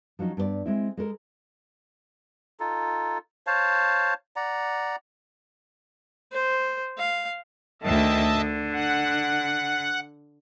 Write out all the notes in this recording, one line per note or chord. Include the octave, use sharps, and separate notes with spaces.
F3 F#3 C#4 D#4
G2 B3 B4 D5
G#3 C4 E4
G#3 A4 A#4
D#4 F4 A4
C5 C#5 F5 A5
D5 F#5 A#5
C5
F5
D2 D#3 D#5 E5 A5
D3
F#5